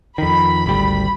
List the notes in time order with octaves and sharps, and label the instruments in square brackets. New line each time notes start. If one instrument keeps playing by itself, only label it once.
[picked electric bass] F2 D#3 [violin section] B5
[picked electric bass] G#1 D2 G3